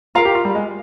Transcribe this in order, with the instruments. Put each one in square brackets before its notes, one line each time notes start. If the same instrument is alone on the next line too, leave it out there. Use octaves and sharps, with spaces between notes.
[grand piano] F4 [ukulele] A#4 F5 A#5
[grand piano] G4
F4
G3
G#3